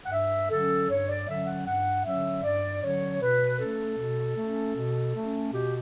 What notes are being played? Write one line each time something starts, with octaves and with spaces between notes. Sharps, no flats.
F#5
G2 E5
D3 F#3 C#4 A4
G2 C#5
D5
D3 F#3 C#4 E5
F#5
G2 F#5
D3 F#3 C#4 E5
G2 D5
D3 F#3 C#4 C#5
B2 B4
A3 C#4 A4
B2
A3 C#4
B2
A3 C#4
B2 G4